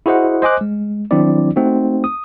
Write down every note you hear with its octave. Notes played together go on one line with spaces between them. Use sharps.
E4 F#4 G#4 C5 D#5 F#5
C5 D#5 G#5 D6 F#6
G#3
D#3 F#3 C4 D4 E4 D5
A3 C4 D#4 F#4
D#6